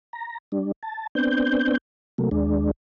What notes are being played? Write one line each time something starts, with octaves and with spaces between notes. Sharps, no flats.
A#5
G3 D4
A5
B3 C4 D4 G6
C3 F#3 A3 A#3
D#2 G#3 D4